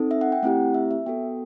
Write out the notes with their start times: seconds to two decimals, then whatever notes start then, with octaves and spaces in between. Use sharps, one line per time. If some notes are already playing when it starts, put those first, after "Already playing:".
Already playing: C4 D#4 A4
0.11 E5
0.21 F#5
0.32 G5
0.43 A3 C4 E4 G4 F#5
0.74 E5
0.91 E5
1.06 B3 F#4 A4 G5